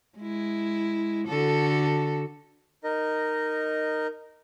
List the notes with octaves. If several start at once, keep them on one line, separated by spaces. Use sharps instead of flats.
G#3 E4
D3 F#4 A4
D#4 A#4 D#5